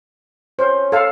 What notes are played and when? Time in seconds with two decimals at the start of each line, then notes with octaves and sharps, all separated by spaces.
0.59 C#4 C5
0.92 A4 F5